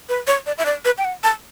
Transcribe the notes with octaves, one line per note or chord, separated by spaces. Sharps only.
B4
C#5
D5
E5
D5
B4
G5
F#5
A5